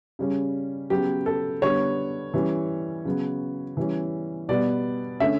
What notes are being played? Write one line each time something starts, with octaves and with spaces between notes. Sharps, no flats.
C#3 G3 C#4
C#3 F#3 B3 G4
A4
D3 G3 B3 C#5
E3 G3 C#4
C#3 F#3 B3
E3 G3 C#4
B2 G3 B3 D5
D3 A3 C#4 E5